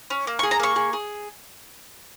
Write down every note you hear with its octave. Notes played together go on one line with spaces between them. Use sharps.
C#4
A#3
C#6
G#4
A#5
A#3 C#6
G#4
G#4